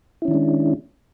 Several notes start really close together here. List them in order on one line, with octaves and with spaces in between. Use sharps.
E4 C#4 D#3 D4 G#3